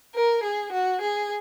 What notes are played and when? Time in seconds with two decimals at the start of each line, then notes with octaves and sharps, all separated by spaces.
0.14 A#4
0.42 G#4
0.72 F#4
1.01 G#4